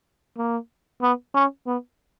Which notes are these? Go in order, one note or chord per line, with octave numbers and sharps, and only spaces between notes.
A#3
B3
C#4
B3